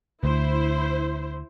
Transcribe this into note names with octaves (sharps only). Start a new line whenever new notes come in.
D2 E4 C5